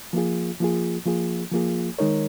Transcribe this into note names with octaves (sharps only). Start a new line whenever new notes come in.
F3 A#3 F4 G#4
F3 A#3 F4 G#4
F3 A#3 F4 G#4
F3 A#3 F4 G#4
D#3 G#3 D#4 A#4 C#5